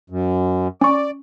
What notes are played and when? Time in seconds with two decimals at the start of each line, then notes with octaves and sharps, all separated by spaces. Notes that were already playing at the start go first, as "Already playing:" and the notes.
0.10 F#2
0.81 C#4 D5 C#6